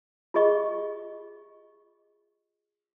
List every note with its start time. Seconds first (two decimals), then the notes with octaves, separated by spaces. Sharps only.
0.34 F4 G4 G#4 D#5 C#6